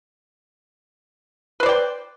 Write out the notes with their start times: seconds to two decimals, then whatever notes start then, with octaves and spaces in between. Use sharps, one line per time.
1.60 B4
1.63 C5
1.66 D5
1.69 G5